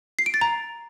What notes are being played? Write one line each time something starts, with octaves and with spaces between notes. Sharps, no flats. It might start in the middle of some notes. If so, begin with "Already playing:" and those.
C7
D7
A6
A#5